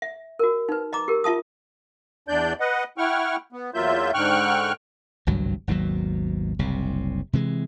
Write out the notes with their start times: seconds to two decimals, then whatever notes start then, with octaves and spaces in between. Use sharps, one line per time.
0.02 E5
0.39 F#4 A#4
0.69 D#4 B4
0.93 D#5 A#5 D6
1.08 G4 A#4
1.24 F4 E5 A5 D#6
2.28 E2 D4 D5 G6
2.60 B4 D#5 F#5
2.98 E4 F#5 G5 C#6 F6
3.52 B3
3.74 E2 F#3 A#3 F4 E5 G6
4.14 G#2 D3 G5 C#6 F6 F#6
5.27 G#1 C#2 G2 F#3
5.67 G#1 D#2 B2 F#3
6.59 F#1 C2 C3
7.33 C3 E3 G#3